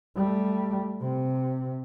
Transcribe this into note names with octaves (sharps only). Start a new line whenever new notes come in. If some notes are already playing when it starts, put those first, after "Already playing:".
G3 A3
C3